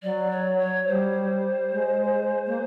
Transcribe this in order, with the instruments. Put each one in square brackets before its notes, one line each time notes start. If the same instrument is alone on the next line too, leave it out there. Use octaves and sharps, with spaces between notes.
[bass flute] F#3 [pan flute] D5
[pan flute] C#5
C#5
[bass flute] G3 [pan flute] C5
[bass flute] G#3
A#3